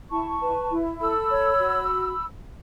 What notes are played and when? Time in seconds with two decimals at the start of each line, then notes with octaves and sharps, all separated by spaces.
0.10 E4 A5 C#6
0.41 B4
0.70 E4
1.00 A4 B5 E6
1.29 C#5
1.59 F#4